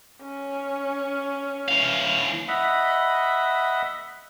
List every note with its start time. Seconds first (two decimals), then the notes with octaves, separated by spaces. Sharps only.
0.23 C#4
1.68 E3 F5
2.48 D#5 E5 F#5 B5